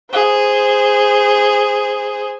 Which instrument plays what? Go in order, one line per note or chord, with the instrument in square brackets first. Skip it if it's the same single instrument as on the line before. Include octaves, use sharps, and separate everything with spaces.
[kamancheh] G#4 C5